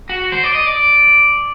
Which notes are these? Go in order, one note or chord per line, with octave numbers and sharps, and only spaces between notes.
F#4
C5
D5
D#5
D5